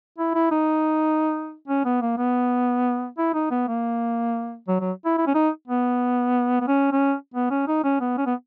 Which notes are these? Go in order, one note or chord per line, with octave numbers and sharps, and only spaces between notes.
E4
E4
D#4
C#4
B3
A#3
B3
E4
D#4
B3
A#3
F#3
F#3
E4
E4
C#4
D#4
B3
B3
C#4
C#4
B3
C#4
D#4
C#4
B3
C#4
B3